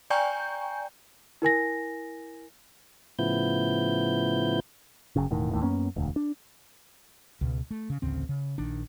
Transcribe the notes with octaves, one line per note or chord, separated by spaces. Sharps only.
D5 G5 G#5 A#5 C#6 G6
E4 A#4 G#5 A#6
A2 C#3 F3 B3 E4 G6
F#1 F#2 C#3
E1 A2 D#3
D#2 A2 D#3
F#2 A#3 B3 C#4
E1 D2
D4
C#2 B2
A3
C#3
A1 D2 C#3 C4
C#3
A#1 D#3 D4